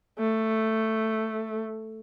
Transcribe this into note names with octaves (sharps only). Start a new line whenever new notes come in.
A3